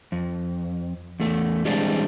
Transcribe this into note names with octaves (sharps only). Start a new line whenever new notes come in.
F2
E2 A3
E3 G3 G#3 C4 D4